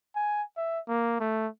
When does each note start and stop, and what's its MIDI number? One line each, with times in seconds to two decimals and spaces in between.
0.16 0.43 80
0.57 0.80 76
0.88 1.18 58
1.20 1.48 57